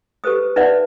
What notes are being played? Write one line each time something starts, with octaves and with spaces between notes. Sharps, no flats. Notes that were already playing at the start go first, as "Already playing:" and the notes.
G4 A4 B4 C5 D#6
D#4 B4 D5 E5 F#5